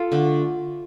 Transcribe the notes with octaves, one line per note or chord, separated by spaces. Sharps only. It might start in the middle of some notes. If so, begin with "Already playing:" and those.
Already playing: F4 A4
D3 A3